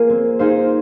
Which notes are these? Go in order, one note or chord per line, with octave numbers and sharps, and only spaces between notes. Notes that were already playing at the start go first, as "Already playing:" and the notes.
Already playing: A#3 F4 G#4
C4
D#4 G#4 C5 F5